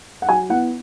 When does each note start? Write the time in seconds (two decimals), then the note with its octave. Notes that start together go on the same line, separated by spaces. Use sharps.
0.22 F#5
0.29 F#3 G#5
0.50 B3 E4 F#5